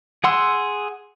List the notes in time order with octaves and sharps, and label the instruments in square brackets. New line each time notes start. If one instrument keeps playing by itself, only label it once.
[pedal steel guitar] G#4 F#5 C6 E6